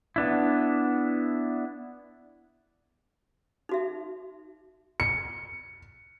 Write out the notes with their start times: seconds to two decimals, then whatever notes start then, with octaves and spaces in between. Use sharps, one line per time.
0.16 B3 D4 E4
3.69 D#4 F#4 E5
5.00 C#7